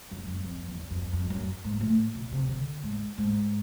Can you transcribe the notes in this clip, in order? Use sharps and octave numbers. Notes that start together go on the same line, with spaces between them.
F#2
F#2
F2
E2
F2
F2
F#2
G#2
A2
B2
C3
D3
G#2
G#2